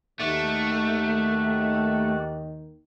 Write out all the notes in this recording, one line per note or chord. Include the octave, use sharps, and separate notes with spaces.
D#2 D#3 A3 F#4 D5